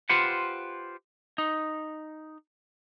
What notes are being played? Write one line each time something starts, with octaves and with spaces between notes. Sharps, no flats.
F4 G4 B4 C5 F#5
D#4